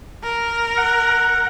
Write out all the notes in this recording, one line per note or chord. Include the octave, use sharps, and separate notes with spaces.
A#4
F#5